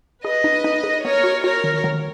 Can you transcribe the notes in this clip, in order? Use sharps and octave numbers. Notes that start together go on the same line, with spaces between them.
G#4 B4 D#5
D#4
D#4
G#4
B3 A#4 C#5
F#4
F#4 A#4 C#5
D#3
D#3